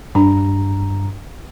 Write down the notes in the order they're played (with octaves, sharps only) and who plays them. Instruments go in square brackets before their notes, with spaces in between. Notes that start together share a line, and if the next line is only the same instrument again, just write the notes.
[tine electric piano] G2 A#5 [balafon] D4